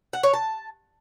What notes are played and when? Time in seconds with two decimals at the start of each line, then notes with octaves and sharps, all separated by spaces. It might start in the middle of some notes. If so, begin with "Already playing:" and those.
0.13 F#5
0.23 C#5
0.34 A5